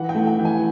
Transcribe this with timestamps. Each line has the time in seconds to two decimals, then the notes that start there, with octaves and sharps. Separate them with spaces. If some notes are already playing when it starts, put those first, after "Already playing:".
Already playing: E3 F#5
0.09 G5
0.15 A3
0.27 G5
0.39 E3
0.45 G#5